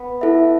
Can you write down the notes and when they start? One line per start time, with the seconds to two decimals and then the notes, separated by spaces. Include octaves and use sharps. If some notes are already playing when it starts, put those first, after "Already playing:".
Already playing: B3
0.21 E4 A4 E5